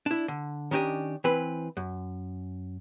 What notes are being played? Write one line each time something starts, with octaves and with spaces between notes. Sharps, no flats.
D4 E4
D3
D#3 C#4 D4 G4 D#5
E3 C4 B4
F#2